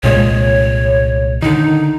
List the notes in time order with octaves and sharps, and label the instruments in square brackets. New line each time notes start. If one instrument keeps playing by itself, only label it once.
[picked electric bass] C2 A#2 G#3 [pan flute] C#5
[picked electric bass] D3 D#3 [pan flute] D#4